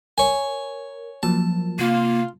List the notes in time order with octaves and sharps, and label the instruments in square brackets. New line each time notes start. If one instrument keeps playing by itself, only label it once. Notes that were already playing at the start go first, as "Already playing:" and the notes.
[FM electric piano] A#4 [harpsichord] C#5 G#5
[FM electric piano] F3 F#3 A#3 [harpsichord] A5
[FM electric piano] C3 [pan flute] A#3 [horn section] F4